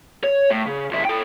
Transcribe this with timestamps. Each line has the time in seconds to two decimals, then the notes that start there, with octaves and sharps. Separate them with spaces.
0.24 C#5
0.51 A2
0.66 C#3
0.91 C#2 E4
1.05 A4 G5